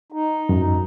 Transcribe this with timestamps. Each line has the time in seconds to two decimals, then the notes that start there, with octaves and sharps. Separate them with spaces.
0.12 D#4
0.49 F#2